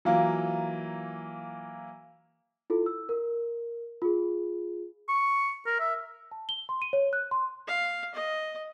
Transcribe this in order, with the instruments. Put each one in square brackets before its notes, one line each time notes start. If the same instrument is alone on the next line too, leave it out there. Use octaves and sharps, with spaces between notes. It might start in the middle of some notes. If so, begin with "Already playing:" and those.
[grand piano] E3 F#3 A#3 [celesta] F4 F5 A#5
[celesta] E4 F4 A4
E6
A#4
F4 G#4
[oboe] C#6
A#4
E5
[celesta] A5
G7
C6
D#7
C#5
F#6
C6
[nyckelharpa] F5
D#5